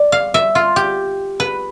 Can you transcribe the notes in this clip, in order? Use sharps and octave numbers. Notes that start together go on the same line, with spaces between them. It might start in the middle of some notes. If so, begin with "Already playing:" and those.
Already playing: D5
F5
E5
F4
G4
B4